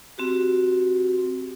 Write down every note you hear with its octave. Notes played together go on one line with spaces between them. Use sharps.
C4 F#4 G4